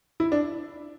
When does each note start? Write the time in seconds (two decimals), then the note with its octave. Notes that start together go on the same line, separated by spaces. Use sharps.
0.20 E4
0.32 D4